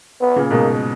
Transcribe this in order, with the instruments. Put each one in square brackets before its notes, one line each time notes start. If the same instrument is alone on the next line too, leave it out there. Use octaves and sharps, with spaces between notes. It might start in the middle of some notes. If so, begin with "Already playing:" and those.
[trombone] B3
[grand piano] A#2 C#3
[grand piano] G#2 B2 [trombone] A#3